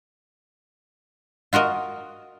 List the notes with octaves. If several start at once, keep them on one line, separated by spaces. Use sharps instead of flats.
F4 F#4 A#4 D#5